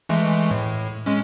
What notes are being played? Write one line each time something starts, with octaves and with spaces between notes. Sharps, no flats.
E3 G#3 A3
A2
G#3 C#4